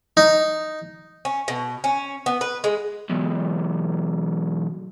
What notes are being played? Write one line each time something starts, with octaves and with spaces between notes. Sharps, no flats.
D#4
C#4
B2
C#4
B3
B4
G#3
B1 E2